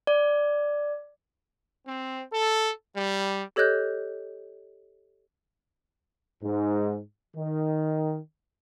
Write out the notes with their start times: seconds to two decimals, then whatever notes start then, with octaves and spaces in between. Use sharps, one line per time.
0.07 D5
1.87 C4
2.33 A4
2.96 G3
3.56 G4 A4 C#5 D#5 F#6 G6
6.43 G#2
7.36 D#3